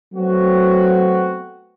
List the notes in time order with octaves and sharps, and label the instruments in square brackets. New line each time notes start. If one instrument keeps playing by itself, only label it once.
[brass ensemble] F#3 A3 B3 C4 F#4